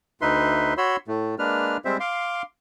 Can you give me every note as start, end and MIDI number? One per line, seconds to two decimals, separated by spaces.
0.21 0.74 38
0.21 0.74 63
0.21 0.74 71
0.21 0.74 76
0.21 0.74 84
0.78 0.97 66
0.78 0.97 73
0.78 0.97 83
0.78 0.97 84
0.78 0.97 88
1.08 1.35 45
1.08 1.35 57
1.39 1.77 56
1.39 1.77 58
1.39 1.77 62
1.39 1.77 71
1.39 1.77 89
1.85 1.97 55
1.85 1.97 56
1.85 1.97 60
1.85 1.97 72
1.85 1.97 76
2.00 2.42 77
2.00 2.42 84
2.00 2.42 86